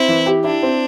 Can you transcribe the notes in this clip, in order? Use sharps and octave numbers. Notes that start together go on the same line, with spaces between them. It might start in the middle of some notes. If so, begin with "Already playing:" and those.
Already playing: C4 E4
E3
G4
D4 E4
C4